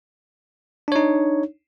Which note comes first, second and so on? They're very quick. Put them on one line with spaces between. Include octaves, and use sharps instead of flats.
D4 C#5 D#4